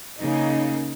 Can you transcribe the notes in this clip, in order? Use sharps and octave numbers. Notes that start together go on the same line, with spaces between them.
C#3 A#3 D#4